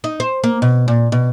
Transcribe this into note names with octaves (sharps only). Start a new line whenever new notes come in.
D#4
C5
A#3
B2
A#2
B2